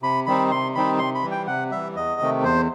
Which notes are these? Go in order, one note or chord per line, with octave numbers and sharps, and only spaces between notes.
C3 B5
D#3 G3 C4 D#4 B5
C3 C6
D#3 G3 C4 D#4 B5
C3 C6
B5
E3 G3
G5
C3 F#5
E3 G3 E5
E2 D#5
C3 D#3 A3
E2 C5